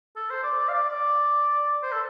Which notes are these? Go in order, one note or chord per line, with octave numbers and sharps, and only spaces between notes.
A4
C5
D5
D5
F5
D5
D5
C5
A4